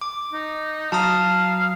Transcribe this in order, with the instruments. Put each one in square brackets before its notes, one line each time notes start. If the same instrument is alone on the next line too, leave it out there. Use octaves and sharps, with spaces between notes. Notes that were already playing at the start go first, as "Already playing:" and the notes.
[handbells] D6
[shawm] D#4
[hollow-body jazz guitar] F#3 [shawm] F5 [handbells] A5 A#5 D#6